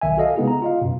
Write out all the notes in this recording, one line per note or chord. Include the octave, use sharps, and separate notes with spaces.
B1 D#3 E5 G#5
F#4 A4 D#5 F5
C#3 G#3 B3 D#4 E4 G#4
A#5
F4 D#5 F5
F#2 B2